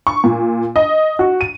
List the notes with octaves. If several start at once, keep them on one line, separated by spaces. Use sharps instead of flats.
C#6
A#2
D#5
F#4
D#7